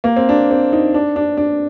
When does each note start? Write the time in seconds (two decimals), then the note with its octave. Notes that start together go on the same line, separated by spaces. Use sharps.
0.04 A#3
0.16 C4
0.29 D4
0.51 C4
0.73 D#4
0.94 D4
1.16 D4
1.37 D4